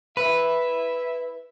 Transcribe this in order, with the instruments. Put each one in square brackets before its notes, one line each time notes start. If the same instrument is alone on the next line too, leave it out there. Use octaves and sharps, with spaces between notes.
[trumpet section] E4 E5 [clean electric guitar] B4